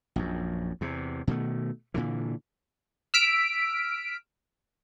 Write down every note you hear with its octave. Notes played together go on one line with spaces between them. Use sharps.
A#1 F#2
E2 C3
B2 D#3 G3 A3
A#2 D3 E3
E6 F6 B6 D7